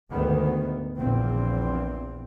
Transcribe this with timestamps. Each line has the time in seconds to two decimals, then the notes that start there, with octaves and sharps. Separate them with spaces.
0.10 D2 G#2 D#3 B3
0.97 A#1 E2 A#2 C4